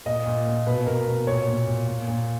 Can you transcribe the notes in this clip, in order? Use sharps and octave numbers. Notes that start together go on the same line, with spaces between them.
A#2 D#5
A#2
A#2
B2 B4
B2 A#4
B2
A#2 C#5
A#2
A#2
A#2
A#2